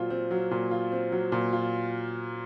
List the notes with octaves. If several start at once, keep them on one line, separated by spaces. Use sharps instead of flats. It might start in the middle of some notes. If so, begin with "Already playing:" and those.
Already playing: A#2 F#3 C4 F4
C4
F#3
A#2
F4
C4
F#3
A#2
F4